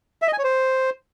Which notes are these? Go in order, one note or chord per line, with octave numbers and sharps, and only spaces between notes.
E5
D#5
G#5
C#5
C5